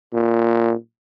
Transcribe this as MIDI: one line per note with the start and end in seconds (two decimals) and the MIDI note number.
0.13 0.73 46